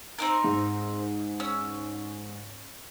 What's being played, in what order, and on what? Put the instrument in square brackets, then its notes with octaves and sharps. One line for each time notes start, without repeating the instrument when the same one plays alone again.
[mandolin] C4 D#4 A#4
[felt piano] G#2
[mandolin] C#4 E6